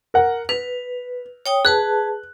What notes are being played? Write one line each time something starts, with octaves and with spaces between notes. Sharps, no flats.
A#4 F#5
B4 F7
C#5 G5 D#6
G#4 B4 A5 F#6